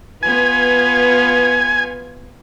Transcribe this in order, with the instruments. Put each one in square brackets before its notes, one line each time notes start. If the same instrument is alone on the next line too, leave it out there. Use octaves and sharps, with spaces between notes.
[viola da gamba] B3 F4 B4 [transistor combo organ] G#5